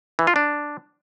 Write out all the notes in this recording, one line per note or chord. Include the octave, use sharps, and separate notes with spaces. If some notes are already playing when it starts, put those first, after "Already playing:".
E3
F4
D4